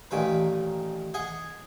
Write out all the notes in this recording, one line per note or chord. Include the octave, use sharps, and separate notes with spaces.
A1 A#2 D#3 C#4 B4
G#4 D#5 F#5 G#5